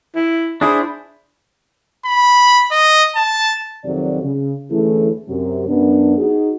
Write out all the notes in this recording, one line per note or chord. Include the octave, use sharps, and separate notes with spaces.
E4
D4 E4 G#4 C5
B5
D#5
A5
F2 C3 D#3 F#3 D5
C#3
D2 E3 A3 C#4 E4 G#4
F#2 C3 F#3
F#2 B3 D4
D#4 F#4 G#4